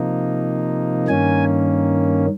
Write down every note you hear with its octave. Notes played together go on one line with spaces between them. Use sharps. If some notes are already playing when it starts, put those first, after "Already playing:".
Already playing: C3 F3 A#3 D#4
G2 D#3 A#3 C#4 G#5